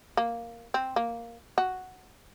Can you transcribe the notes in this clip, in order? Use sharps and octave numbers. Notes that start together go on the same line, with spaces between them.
A#3
C4
A#3
F#4